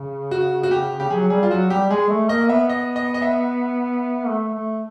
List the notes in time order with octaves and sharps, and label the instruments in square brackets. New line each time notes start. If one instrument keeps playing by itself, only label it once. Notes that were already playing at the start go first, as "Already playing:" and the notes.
Already playing: [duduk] C#3
[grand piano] F#4
F#4
G4
G4
[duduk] F#3 [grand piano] G#4
[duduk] G3 [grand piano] G#4
[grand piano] F4
[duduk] F#3 [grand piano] F#4
[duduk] G3 [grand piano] G4
[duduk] G#3 [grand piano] G#4
[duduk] A3
[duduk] A#3 [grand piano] D#5
[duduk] B3 [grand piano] E5
[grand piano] D#5
D#5
D#5
E5
[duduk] A3
A3